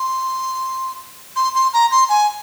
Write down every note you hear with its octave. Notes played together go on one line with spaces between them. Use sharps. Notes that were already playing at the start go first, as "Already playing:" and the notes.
Already playing: C6
C6
C6
A#5
C6
G#5